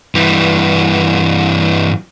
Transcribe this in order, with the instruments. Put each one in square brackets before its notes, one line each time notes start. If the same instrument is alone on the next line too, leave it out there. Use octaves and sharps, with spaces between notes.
[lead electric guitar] G2 E3